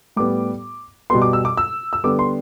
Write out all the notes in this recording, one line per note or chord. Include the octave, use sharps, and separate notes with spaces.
A2 G3 B3 D6
B2 G3 B3 C6
D6
E6
D6
E6
E6
D3 G3 B3 D6
C6